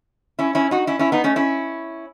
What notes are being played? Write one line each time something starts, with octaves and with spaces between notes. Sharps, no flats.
C#4 E4
C#4 E4
D#4 F#4
C#4 E4
C#4 E4
B3 D#4
A3 C#4
C#4 E4